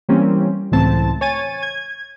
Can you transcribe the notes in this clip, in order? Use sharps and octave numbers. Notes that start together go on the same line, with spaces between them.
E3 G3 A#3 C4 C#4
C#2 A2 E3 C4 A5
C#5 G#5 A6 D#7
G#6